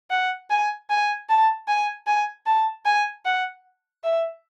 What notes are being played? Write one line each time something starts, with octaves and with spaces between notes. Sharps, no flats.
F#5
G#5
G#5
A5
G#5
G#5
A5
G#5
F#5
E5